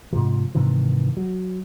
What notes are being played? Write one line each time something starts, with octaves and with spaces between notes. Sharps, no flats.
G#2 C3 F3
G#2 C3 D#3 E3
F#3